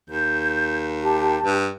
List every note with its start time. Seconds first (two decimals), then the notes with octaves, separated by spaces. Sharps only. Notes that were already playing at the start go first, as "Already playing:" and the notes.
0.10 D#2 G6
1.02 G4 A5
1.45 G2